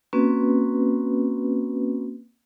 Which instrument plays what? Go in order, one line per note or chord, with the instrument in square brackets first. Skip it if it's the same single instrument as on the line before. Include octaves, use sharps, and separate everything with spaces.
[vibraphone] A#3 C4 C#4 F#4 B4